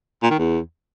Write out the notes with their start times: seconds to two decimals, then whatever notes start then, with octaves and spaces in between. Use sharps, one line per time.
0.23 A#2
0.31 D#3
0.38 E2